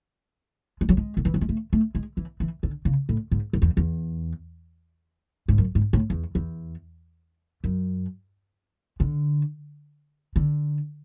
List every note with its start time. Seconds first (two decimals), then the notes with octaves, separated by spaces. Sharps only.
0.81 G#3
0.89 F#3
0.97 G#3
1.17 D3
1.25 E3
1.34 F#3
1.41 G#3
1.49 A3
1.73 A3
1.95 G#3
2.17 E3
2.40 E3
2.63 D3
2.85 C#3
3.09 A2
3.31 G#2
3.53 F#2
3.62 E2
3.77 E2
5.48 G#2
5.58 F#2
5.75 G#2
5.93 A2
6.10 E2
6.35 E2
7.64 F#2
9.00 D3
10.36 D3